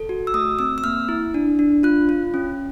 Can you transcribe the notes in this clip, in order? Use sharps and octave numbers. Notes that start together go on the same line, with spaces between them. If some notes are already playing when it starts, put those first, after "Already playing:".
Already playing: A4
F#4
E6
A3 D#6
C4 E6
E6
A#3 F6
E4
D4
D4
F4 F#6
F4
C#4